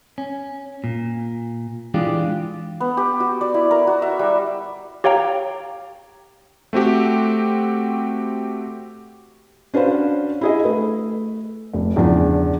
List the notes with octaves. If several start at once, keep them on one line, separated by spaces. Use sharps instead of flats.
C#4
A#2
E3 G#3 D4 F4 G4
B3
G4
F#4
D5
E4
A#4
F#4
E5
G3
G4 C#5 F5 G5 A#5
A3 C4 F#4 G4
C#4 D4 F#4 B4 C5 F5
E4 G#4 D#5
A3 B4
F1
E2 C#3 F3 D4